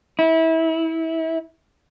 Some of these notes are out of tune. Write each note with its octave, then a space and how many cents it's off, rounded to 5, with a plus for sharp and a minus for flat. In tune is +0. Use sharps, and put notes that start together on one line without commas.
E4 -25